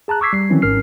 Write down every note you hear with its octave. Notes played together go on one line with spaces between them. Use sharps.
G#4 A5 A#5 F#6
C#6 D6 E6 G#6 B6 C7
G3 C7
D#3 E3 F#3 C4 C#4 E4
G#1 G#2 C#4 A#4 F6 C7